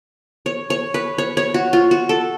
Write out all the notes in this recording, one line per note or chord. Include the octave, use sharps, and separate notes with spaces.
C#5
C#5
B4
C#5
C#5
F#4
F4
F#4
A4